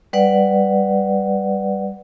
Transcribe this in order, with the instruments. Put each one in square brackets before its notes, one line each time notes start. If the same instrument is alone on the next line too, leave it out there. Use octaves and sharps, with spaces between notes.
[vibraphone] G3 B4 D5 F#5